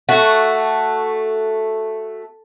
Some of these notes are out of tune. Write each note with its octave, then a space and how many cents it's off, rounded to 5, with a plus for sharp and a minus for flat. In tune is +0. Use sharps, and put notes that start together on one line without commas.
A3 +0 F#4 +0